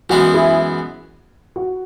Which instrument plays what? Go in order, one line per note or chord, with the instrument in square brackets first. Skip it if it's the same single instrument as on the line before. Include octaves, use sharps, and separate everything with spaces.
[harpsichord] F#2 E3 G#3 B3 [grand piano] F#4
[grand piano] E4 G#4
F#4